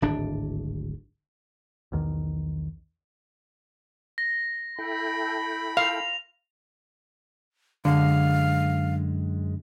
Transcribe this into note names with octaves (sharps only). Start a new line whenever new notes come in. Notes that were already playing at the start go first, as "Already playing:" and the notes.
D1 G#1 D4
B1 E2 D#3
A#6
E4 A4 G5 B5
F5 F7
F#2 D3 G#3 F5